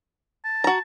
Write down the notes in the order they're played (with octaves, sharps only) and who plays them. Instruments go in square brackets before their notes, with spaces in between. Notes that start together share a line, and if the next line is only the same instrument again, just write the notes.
[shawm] A5
[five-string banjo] F#4 A#5